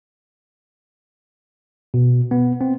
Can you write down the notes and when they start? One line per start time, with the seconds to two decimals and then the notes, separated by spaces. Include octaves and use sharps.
1.94 B2
2.31 B3
2.61 C4